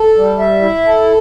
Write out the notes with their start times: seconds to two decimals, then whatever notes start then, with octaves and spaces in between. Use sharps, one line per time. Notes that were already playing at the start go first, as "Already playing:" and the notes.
Already playing: A4
0.16 G3
0.39 E5
0.62 E4
0.85 A4